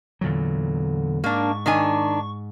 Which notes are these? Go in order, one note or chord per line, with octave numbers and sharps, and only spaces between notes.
E2 A#2 D3 F#3
G#2 A#3 D4 C#6
D#3 D4 G#5